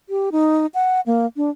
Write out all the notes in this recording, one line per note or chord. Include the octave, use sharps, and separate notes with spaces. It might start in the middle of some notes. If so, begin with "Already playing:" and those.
G4
D#4
F#5
A#3
D4